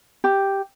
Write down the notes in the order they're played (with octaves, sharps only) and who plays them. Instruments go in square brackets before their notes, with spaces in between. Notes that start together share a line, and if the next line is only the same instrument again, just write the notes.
[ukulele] G4